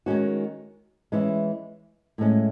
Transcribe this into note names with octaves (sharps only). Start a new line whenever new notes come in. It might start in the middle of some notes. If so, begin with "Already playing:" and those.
D#3 G#3 C#4 F#4
E3 G#3 C#4 E4
A2 G#3 C#4